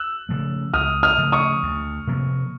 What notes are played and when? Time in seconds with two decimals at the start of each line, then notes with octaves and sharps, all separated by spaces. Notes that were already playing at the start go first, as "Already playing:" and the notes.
Already playing: E6 F#6
0.29 C#3 F3 A3
0.73 C#2 D#6 F6
1.03 D#6 F6
1.18 C#3 F3 A3
1.32 C#6 D#6
1.63 D2
2.07 C3 F3 A#3